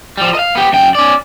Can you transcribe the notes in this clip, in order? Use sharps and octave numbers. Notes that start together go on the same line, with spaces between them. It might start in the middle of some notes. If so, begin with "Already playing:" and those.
F3 G3
D#5 F5
B3 G4
F#2 G5
C#4 D5